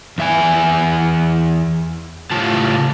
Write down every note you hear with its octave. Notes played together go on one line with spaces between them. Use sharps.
E2 E5 G#5
A2 C#3 F4 A5